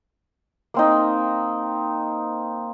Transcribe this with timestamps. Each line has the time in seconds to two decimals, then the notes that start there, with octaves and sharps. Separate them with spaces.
0.74 A#3 C4 D#4